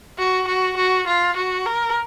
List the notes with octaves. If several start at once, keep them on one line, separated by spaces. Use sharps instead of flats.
F#4
F#4
F#4
F4
F#4
A#4